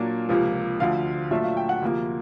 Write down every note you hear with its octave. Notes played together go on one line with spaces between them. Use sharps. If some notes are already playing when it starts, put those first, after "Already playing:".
Already playing: A#2 F#3 A#3 D4
C#2 C3 F3 A#3
D2 D3 F3 F5
A#2 F#3 A3 D4 F4 E5
F5
G5
F#5
D2 C3 F3 A#3